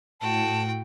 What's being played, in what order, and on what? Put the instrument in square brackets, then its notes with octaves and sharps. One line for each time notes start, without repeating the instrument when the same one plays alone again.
[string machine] A2 [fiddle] F#4 G5 [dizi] A5